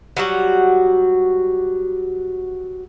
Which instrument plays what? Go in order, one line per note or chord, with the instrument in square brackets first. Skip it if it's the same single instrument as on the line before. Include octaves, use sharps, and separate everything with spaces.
[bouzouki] F#3 G3 F#4